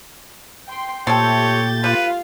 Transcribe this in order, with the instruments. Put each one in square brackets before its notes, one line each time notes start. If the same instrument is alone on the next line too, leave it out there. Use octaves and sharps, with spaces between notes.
[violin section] G5 C6
[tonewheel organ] A#2 A6 [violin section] A3 G4 G6 [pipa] C4 A4 [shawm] C#5
[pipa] G3 [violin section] F4 F5 [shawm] B4